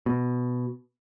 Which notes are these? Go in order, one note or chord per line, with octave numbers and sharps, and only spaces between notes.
B2